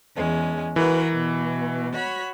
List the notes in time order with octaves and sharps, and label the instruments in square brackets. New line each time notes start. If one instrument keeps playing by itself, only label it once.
[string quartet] E2 G#3 C#4
[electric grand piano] E3 [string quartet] F#4 A#4 B4
[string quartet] B2
F#4 C#5 B5